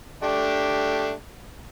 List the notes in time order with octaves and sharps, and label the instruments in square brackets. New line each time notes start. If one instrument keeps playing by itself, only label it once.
[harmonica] A3 D4 G4